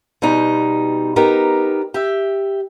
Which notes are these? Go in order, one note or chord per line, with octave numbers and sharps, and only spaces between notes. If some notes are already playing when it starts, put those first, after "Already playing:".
B2 G3 D#4
B3 D#4 G4 A#4
G4 E5